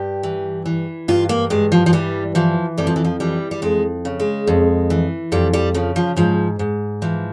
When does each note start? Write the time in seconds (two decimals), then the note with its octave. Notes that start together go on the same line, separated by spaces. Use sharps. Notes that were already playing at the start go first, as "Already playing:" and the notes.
Already playing: G2 G4
0.23 E3
0.66 E3
1.08 G2 F4
1.29 A#3
1.50 G2 G#3
1.72 F3
1.86 F3
1.93 E3 G3
2.35 E3 F3
2.78 F2 G3
2.87 F3
2.96 E3
3.05 F3
3.20 E3 G3
3.51 G3
3.62 F2 G#3
4.05 C#3
4.20 G#3
4.47 F2
4.90 E3
5.32 F2 G3
5.53 G3
5.74 C#3 F3
5.96 F3
6.16 G#2 F3
6.59 G#2
7.02 E3 F3